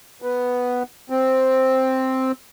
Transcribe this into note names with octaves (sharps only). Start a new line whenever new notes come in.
B3
C4